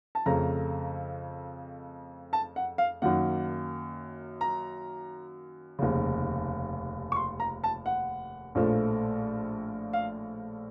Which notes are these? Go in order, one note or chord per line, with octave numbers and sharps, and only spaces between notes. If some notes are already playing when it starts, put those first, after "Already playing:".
A5
F2 C#3 A3 A#5
A5
F#5
F5
F#2 D#3 A#3 F#5
A#5
F1 D#2 C#3
C#6
C6
A#5
A5
F#5
A#1 A2 F3 A3
F5